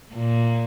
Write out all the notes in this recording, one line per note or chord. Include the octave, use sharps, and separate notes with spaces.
A#2